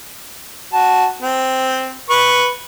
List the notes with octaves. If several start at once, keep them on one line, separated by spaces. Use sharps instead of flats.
F#4 A5
C4
B4 B5 C#6